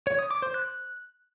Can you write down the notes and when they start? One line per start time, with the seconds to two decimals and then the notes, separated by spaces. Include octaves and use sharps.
0.07 C#5
0.19 D#6
0.31 D6
0.42 C5
0.54 F#6